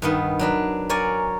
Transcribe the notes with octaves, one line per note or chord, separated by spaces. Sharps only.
G2 D#3 B3
F#3 D4 B4
A#4 C#5 D5 G#5